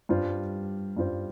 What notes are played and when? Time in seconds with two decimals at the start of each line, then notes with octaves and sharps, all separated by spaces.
0.09 G2 G3 F4 C5
0.97 G2 G3 F4 C5